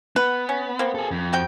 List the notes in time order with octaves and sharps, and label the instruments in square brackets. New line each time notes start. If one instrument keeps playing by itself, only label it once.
[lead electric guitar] B3 [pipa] B4
[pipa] C#4
A#3 C4
[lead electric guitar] G#4 A4
F2
[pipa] C4 F#4 G5